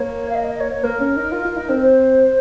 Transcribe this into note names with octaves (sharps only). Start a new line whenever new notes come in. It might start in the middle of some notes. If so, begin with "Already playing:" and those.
Already playing: A#3 C#5
F5
D#5
D#5
C#5
C#5
A#3 A#4
C#4
D#4
F4
F4
D#4
C4
C5